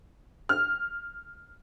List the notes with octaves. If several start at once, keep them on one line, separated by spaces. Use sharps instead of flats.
F6